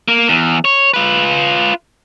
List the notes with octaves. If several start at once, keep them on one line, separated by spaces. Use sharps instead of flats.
A#3
E2
C#5
F4 B4